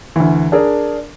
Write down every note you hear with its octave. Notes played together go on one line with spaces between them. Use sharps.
D2 E3
D4 G#4 A#4